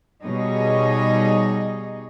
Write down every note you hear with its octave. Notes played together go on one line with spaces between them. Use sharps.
B2 G3 D#4 G#4 C#5 D#5